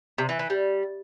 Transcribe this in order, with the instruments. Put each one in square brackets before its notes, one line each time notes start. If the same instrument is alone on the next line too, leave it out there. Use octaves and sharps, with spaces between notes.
[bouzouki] C3
E3
E3
G3